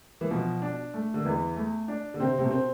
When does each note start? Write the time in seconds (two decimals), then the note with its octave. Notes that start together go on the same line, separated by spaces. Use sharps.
0.21 E3
0.31 B2 F3
0.62 D4
0.94 A3
1.14 D3
1.25 E2 E3
1.56 A3
1.88 D4
2.14 D3
2.20 C3 C4
2.38 C3
2.43 B2
2.51 C4